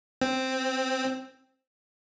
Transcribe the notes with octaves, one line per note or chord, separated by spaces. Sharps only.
C4